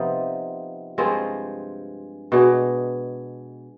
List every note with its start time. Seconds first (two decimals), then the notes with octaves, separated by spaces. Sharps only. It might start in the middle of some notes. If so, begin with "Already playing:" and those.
Already playing: C3 F3 B3 D#4
0.98 G2 F3 G#3 C4
2.32 B2 G#3 D4